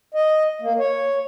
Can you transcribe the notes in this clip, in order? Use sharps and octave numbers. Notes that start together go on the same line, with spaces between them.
D#5
A#3
C#5